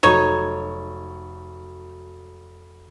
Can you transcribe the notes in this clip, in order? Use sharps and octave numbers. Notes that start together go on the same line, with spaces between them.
F1 F#3 D#4 C#5